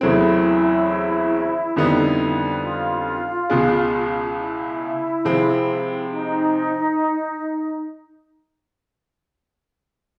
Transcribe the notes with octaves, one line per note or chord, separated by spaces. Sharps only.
E2 C#3 F#3 A3 C4 E4
F2 D3 G3 B3 D#4
F4
C#2 B2 G#3
E4
C3 F3 G#3 C4
D#4